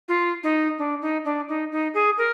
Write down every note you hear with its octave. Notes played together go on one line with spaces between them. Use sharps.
F4
D#4
D4
D#4
D4
D#4
D#4
G#4
A#4